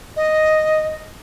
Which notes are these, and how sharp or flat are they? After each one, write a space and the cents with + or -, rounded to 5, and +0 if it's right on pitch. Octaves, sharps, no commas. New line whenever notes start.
D#5 +0